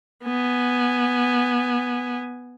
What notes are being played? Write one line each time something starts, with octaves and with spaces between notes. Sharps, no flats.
B3 G#5